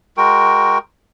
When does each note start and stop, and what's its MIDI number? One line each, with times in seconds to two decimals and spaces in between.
0.17 0.78 56
0.17 0.78 66
0.17 0.78 70
0.17 0.78 79